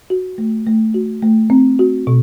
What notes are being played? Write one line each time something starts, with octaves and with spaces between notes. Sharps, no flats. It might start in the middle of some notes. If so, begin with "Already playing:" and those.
F#4
A3
A3
F#4
A3
C4
F#4
B2